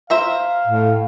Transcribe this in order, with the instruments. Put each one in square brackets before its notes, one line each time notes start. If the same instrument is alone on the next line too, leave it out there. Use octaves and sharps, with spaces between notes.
[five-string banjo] C5 E5 A#5 [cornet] F5
[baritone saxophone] A2